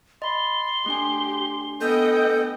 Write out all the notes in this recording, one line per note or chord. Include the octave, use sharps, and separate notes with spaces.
D#5 B5 C6
A3 D4 G4 G#5
B3 A4 D#5 G5 G6